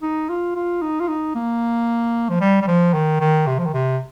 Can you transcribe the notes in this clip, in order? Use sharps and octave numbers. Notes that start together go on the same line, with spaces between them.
D#4
F4
F4
D#4
F4
D#4
A#3
F3
G3
G3
F3
D#3
D#3
C3
F3
D#3
C3